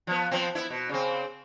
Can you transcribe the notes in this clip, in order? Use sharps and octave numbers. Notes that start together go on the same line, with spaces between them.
F3 B3
F3 B3 C4
B3 E4
B2
C#3 C4